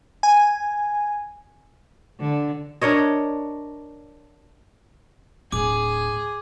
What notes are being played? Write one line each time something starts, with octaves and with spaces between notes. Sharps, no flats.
G#5
D3
D4 A#4 C#5 D#5
D1 G#4 D6